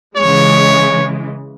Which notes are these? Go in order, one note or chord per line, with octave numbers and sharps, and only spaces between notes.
C#3 E3 G#3 C#5